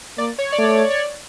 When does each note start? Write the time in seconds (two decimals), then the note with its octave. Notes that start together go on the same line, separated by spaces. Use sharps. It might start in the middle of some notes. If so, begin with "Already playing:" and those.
0.18 A#3 D5
0.39 C#5
0.52 D5
0.59 A3
0.66 C#5
0.91 C#5
0.99 D5